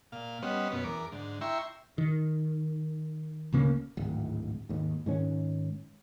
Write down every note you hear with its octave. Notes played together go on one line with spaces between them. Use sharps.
A#2 F5
G3 B3 C#4 C5 D#5 F#5
F#2 B2 B3 C#4
E2 A#4 D6
G#2 D3
E4 E5 G5 A#5 C6 C#6
D#3
D2 C#3 A#3 C#4
D1 G#1
G#1 D#2
G#2 D#3 C#4